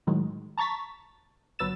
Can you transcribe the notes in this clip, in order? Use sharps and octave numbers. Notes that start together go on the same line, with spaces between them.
A2 D#3 F#3 G#3
A5 A#5 C#6 A6 B6
G1 F#3 B4 E6 A6 E7